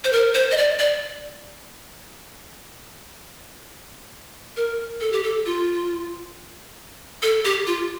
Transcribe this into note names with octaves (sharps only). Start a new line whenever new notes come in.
C5
A#4
C5
D#5
D5
D5
A#4
A4
G4
A4
F4
A4
G4
F4